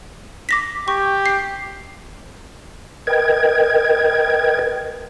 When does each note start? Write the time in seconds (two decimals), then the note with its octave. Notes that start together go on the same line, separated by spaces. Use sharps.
0.49 D6 A#6 B6
0.88 G4 C#6
1.26 C7
3.07 A#4 B4 D#5 G5 G#6